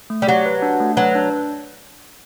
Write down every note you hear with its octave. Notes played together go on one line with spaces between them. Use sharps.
A3
G3
F#3 G4
B4
D4
A3
F#3 B4
D4